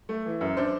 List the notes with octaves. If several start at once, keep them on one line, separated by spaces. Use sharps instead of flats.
A3
E3
F#2
D4 C5